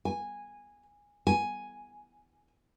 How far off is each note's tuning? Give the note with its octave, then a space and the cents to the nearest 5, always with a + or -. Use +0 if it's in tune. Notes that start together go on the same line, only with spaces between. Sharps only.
G#5 -10
G#5 +0